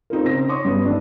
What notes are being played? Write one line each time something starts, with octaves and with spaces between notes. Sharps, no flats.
C4 D#4 F4 A#4
C#3 C4 D#4 A#6
C#5 C6 C#6 D#6
G2 G3 B3
D#3 A3 D4